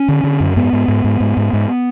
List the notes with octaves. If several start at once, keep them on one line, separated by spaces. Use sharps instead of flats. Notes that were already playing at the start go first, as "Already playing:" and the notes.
Already playing: C#4
D3
D3
F#2
G#2 B3
G#2
G#2
G#2
G#2
G#2
G#2